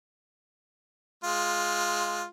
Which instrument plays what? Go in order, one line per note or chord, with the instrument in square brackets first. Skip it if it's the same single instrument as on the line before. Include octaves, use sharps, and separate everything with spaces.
[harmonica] G#3 F4